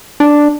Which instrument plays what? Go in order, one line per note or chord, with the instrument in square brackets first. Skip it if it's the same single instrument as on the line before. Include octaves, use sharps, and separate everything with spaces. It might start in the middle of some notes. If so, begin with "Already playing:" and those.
[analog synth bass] D4